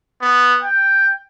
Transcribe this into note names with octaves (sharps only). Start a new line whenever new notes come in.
B3
G5